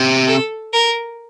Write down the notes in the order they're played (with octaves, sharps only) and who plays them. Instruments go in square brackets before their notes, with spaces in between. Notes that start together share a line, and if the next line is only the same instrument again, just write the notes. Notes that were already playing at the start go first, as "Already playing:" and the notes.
Already playing: [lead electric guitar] C3
[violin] A4
A#4